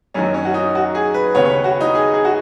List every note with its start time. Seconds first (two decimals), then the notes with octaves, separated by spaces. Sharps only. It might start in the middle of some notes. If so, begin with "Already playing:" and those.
0.14 F#2 D#3 F#3 C#4
0.34 C#4
0.45 F#4
0.54 D#4
0.75 F#4
0.95 G#4
1.14 B4
1.35 D#2 C#3 B3 C#5
1.45 C#5
1.50 B4
1.64 F#4
1.80 D#4
1.95 G#4
2.14 G#4
2.25 F#4